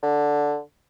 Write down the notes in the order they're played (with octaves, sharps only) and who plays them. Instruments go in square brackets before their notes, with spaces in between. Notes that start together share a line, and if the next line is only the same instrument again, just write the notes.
[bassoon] D3